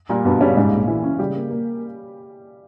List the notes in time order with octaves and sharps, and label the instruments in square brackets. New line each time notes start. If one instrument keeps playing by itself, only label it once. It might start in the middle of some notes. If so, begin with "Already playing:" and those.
[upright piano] A#2 A#3 [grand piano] G3
[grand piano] G2 [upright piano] B2 B3
[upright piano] C#3 C#4 [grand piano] G3
[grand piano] G#2 [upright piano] C#3 C#4
[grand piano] A#1
[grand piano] A#2 [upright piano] E3 E4
[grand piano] C#4
[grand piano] C#3 [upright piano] G3 G4
[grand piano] A#3
A#3